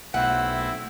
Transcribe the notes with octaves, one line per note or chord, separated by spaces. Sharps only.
B1 A3 C4 E4 F#5